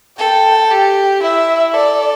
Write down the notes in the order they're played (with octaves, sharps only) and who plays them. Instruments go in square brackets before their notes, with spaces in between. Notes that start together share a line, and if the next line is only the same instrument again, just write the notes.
[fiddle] A4 [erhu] G5
[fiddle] G4 [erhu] G5
[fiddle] E4 [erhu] E5
[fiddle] A4 [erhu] D5